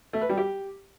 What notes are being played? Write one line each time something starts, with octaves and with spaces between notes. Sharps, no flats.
A3
B4
G3
G4